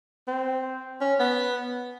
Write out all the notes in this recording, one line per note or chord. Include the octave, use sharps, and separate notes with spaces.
C4
C#4
B3